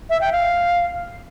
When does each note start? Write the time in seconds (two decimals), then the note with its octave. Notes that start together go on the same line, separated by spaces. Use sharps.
0.10 E5
0.21 G5
0.32 F5